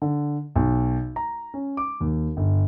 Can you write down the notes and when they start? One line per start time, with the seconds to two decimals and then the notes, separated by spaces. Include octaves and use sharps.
0.02 D3
0.56 B1
1.16 A#5
1.54 C#4
1.77 D6
2.00 D#2
2.37 G1